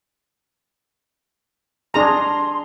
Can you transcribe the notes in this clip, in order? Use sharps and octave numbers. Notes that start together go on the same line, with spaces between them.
D4 G#4 A#5 C6